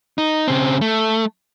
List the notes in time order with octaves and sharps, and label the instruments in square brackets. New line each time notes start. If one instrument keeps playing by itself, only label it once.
[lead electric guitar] D#4
C#3 C4
A3